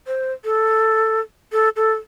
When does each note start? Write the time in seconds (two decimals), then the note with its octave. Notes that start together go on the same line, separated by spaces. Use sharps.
0.07 C5
0.44 A4
1.52 A4
1.76 A4